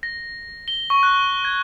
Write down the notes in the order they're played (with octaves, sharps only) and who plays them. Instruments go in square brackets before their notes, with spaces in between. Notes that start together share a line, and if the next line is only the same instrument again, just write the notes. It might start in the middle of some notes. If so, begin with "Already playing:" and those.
[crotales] A#6
G7
C#6
F#6
G#6